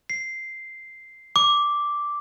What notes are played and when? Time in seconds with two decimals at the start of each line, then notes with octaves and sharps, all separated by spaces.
0.10 C7
1.36 D6